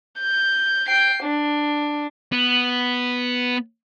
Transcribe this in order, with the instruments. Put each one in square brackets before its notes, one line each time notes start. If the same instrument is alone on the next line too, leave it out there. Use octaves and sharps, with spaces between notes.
[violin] G6
G5 C7
D4
[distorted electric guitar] B3